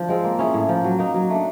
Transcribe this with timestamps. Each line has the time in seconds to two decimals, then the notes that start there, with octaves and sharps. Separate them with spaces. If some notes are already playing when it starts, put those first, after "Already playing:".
Already playing: F3 D4
0.09 G#3 C4 F4
0.24 A#3
0.39 C#4 E4 G#4
0.54 A2
0.68 F3 A#3
0.84 F#3
0.99 A#3 D#4
1.14 F#3
1.30 A3 D4